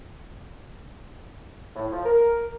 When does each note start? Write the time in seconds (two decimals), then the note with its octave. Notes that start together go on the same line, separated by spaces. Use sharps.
1.76 A2
1.92 F3
2.05 A#4